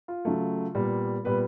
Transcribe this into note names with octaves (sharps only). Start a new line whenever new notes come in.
F4
C#3 F#3 A3
A#2 G3 B3
A#2 G3 B3 B4